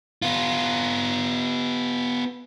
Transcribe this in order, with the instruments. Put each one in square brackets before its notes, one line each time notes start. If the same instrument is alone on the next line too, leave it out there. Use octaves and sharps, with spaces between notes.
[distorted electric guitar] B3 F4